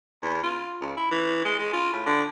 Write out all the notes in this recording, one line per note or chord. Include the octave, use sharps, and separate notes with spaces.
E2
F4
C#2
E4
E3
G#3
G#3
F4
A2
D3